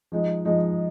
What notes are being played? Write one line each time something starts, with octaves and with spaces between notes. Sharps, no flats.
F3 G#3 D#4
F3 G#3 D#4